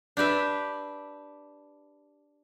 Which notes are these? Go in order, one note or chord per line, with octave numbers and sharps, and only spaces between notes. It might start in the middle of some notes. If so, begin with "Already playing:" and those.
D4 G4 B4 E5